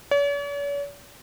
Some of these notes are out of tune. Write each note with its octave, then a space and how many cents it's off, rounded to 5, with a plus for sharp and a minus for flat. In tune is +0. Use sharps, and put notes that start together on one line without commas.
C#5 +45